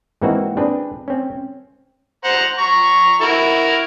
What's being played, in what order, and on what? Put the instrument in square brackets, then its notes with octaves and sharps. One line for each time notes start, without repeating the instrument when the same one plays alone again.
[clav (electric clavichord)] G#2 E3 A#3 C4 D#4 F#4
C4 D4 G#4 B4
C4 C#4
[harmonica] C5 F#5 A#5
A#5 C#6
E4 F#4 A#4